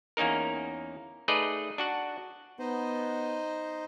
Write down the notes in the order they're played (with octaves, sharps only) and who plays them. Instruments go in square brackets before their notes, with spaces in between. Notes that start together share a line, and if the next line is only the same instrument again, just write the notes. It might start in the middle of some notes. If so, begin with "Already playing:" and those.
[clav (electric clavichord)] E2 A#3 C#4 D#4 A#4
A3 D#4 G#4 B4 D5 D#5
D4 F#4 F#5
[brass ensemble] B3 [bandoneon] D#4 C5 D#5